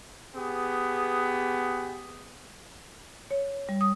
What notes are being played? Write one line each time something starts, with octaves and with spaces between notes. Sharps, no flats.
B3 G4 G#4
C#5
G3
D#6